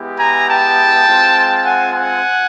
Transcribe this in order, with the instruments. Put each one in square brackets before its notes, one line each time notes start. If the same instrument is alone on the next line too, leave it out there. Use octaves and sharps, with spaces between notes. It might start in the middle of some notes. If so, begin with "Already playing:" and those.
Already playing: [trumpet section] G#3 B3 E4 G4
G#5 A#5
G5 A5
G#3 C4 F4
F#5 G#5
F#5 G#5